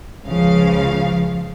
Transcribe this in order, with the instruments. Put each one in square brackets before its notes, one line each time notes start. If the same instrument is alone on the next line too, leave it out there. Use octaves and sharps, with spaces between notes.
[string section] C#2 C#3 F3 F5